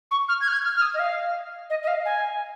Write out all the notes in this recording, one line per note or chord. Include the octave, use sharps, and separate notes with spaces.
C#6
F6
G#6
F6
G#6
F6
F6
D#6
D#5
F5
D#5
D#5
F5
G#5